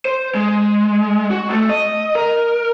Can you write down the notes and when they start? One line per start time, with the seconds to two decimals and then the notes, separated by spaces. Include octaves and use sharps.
0.05 C5
0.35 G#3
1.30 F#4
1.50 A3
1.69 D#5
2.15 A#4